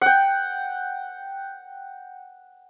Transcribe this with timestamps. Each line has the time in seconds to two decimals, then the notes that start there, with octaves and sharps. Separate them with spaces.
0.02 F#5 G5